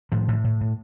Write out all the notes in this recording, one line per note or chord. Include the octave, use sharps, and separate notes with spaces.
A2 D#3 F3
A2
A2
A2